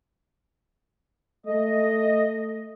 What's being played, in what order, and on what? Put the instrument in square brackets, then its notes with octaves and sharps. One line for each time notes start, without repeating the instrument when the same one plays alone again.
[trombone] A3 [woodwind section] D#5